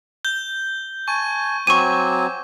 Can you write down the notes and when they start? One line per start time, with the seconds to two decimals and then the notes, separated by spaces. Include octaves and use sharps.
0.24 G6 G7
1.08 G#5 A5 C#6 D#7
1.67 F#3 C4 G#5 C#6 D6 D#7